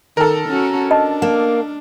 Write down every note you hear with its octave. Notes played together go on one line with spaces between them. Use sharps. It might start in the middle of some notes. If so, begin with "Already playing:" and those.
D#3 A4 A#4
C#4 F#4
D4 D#5 A5
A#3